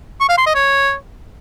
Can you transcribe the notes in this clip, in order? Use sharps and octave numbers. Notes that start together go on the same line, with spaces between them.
C#6
F5
C6
D#5
C#5